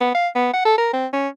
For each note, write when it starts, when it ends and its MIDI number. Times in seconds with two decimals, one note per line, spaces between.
0.01 0.12 59
0.15 0.28 77
0.36 0.50 59
0.53 0.62 78
0.66 0.77 69
0.78 0.89 70
0.93 1.07 60
1.13 1.28 61